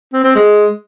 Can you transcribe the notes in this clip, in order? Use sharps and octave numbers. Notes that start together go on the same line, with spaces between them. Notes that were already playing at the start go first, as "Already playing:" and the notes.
C4
C4
G#3